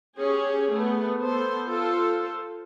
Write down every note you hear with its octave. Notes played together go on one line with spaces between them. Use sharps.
C#4 G4 G#4
A3 B3
B3 A4 C5
F4 A4 C5